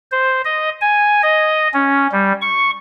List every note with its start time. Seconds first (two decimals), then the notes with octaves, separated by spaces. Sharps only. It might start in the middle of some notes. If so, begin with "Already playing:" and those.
0.12 C5
0.45 D#5
0.81 G#5
1.23 D#5
1.74 C#4
2.12 G3
2.42 C#6